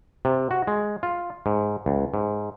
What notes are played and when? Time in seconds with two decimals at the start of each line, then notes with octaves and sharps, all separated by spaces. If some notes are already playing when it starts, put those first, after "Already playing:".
0.25 C3
0.51 F#4
0.67 G#3
1.03 F4
1.46 G#2
1.86 C#2
2.14 G#2